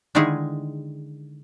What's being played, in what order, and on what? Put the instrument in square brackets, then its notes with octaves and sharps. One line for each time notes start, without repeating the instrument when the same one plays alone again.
[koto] D3 D#3 G#3 D#4 E4 G#4